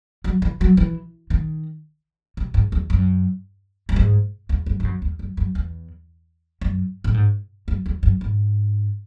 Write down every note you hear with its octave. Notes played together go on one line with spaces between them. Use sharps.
F#3
E3
F#3
E3
D#3
C3
G#2
E2
F#2
F#2
G#2
E2
F#2
G#2
F#2
E2
F#2
F#2
E2
F#2
A2
G#2
F#2
E2
F#2
G#2